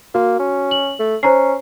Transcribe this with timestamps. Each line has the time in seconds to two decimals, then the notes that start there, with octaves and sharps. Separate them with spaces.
0.15 A#3 F#4
0.39 C#4
0.71 F#7
0.99 A3
1.23 C#4 C5 A#5 C7